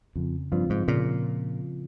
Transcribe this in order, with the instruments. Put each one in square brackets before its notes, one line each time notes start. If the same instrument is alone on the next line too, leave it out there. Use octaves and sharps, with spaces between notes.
[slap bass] F2 [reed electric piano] C#3
[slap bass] G2 [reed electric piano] F3 C4 F4
[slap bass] G#2
[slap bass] A#2 [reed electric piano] C#3